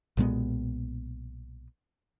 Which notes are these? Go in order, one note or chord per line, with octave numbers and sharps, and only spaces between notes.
B1 A#2 G#3 B3